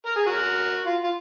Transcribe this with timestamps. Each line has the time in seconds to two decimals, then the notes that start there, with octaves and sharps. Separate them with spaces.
0.06 A#4
0.16 G#4
0.26 F#4 A#4
0.86 F4
1.04 F4